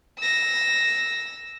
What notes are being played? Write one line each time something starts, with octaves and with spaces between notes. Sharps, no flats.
E6 A#6